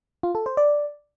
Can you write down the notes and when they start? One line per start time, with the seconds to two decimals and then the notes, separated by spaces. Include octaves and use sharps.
0.23 F4
0.35 A4
0.46 C5
0.57 D5